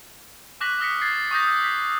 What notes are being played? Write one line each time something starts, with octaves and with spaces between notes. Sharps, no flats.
C#6 D6 F#6 A#6 B6 F#7
D#6 F6 A#6 B6 C#7
G#6 A6 C7
C#6 D#6 G6 A#6
E6 G6
B6